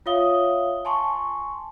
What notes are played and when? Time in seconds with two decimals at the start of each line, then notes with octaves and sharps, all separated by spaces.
0.06 F4 C#5 E5 F5 D#6 G7
0.85 G#5 A5 C6 C#6